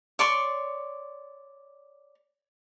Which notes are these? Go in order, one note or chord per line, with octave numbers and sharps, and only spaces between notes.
C#5 D5 C6 C#6